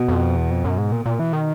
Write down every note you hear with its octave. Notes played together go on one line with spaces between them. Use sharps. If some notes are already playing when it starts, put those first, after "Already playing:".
Already playing: B2
F2
E2
F2
F#2
G#2
A#2
A#2
E3
D#3